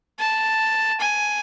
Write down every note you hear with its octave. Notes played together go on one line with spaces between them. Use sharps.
A5
G#5